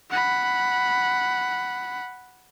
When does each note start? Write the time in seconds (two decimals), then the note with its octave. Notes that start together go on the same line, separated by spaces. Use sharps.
0.10 F#5 B5